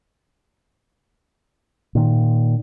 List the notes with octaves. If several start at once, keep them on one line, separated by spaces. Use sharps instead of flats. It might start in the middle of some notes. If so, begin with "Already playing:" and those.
A#2 D#3